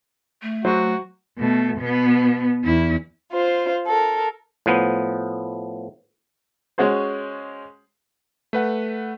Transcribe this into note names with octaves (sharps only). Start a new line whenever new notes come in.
A3
F#3 F#4 C5
B2 A3
B2 B3
E2 E4
F4 C5
A4 A#4
A2 F3 B3
G#3 C#4 F#4 G#4 C5
A3 B4 F#5